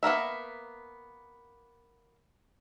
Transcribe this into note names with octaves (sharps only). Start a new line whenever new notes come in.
A#3 B3 A#4 E5